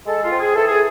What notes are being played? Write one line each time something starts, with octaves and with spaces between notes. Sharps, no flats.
G#3 A4
F4
C4
G#4
E3 A4
G#4